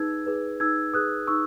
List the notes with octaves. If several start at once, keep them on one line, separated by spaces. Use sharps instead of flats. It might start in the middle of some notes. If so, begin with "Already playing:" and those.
Already playing: D#4 G#4 B4 E6 G#6
G#4 B4
D#4 E6 G#6
G#4 B4 D#6 F#6
D#4 C#6 E6